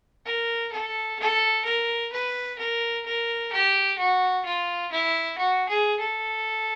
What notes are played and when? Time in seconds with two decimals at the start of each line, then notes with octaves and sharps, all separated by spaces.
0.25 A#4
0.72 A4
1.19 A4
1.65 A#4
2.12 B4
2.58 A#4
3.05 A#4
3.52 G4
3.98 F#4
4.45 F4
4.92 E4
5.38 F#4
5.69 G#4
6.00 A4